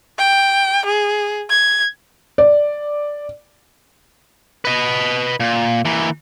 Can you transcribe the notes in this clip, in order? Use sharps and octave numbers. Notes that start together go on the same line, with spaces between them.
G5
G#4
G#6
D5
B4 D#5
A#2
E3 A#3